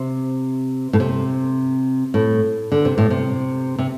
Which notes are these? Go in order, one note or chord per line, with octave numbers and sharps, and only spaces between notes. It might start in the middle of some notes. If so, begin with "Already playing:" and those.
Already playing: C3
A2
C3
A2
D3
C3
A2
C3
C3